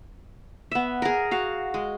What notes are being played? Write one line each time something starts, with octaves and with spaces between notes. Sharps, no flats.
B3 E5
G#4 A#4
F#4 F5
G#3